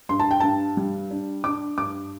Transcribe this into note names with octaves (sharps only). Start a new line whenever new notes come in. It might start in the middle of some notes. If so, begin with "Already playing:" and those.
G2 C6
A5
G5
G2 A5
G3
D4
D4 D6
G2 D6